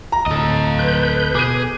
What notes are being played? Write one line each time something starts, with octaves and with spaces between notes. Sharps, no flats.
A#5
D2 A2 A4 D#5
B4 G6
B2 G#4 D6 D#7